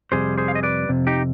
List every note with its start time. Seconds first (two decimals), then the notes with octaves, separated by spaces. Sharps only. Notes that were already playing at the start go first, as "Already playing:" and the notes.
0.12 F2 C3 G3 G#4 C5
0.38 G#4 C5
0.48 F5
0.55 D#5
0.63 B4 D5
0.89 F2 C3
1.07 D#4 G4